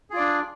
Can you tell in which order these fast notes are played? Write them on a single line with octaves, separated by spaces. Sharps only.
G#4 F4 D5 D4